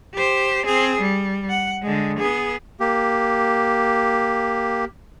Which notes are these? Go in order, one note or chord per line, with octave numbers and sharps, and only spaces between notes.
G4 C5
C4 G#4
G3
F#5
D3 G#3
B3 G#4
A#3 G4